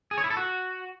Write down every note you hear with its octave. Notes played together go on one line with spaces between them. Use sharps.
G#4
C#5
E4
A4
F#4